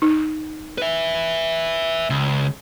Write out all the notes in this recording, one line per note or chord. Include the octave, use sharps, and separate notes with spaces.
D#4
B4 E5
C#2